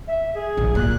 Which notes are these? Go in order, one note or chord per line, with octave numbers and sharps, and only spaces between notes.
E5
G#4
A#1
A#2 F#6